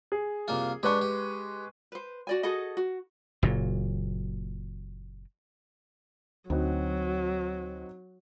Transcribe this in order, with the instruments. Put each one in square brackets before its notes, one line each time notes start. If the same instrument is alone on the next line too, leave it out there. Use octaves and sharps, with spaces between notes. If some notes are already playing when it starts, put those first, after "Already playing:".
[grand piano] G#4
[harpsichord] C2 A#3 F4
[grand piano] G#3 B4 C#6 [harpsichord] D4 G4
[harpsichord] G4
[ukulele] B4 C5
F#4 D5 G#5
F#4 G#4 A4 D#5
F#4
[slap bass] F#1 A#2 F#3
[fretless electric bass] D2 [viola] F#3 [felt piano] C4 D#4 F#4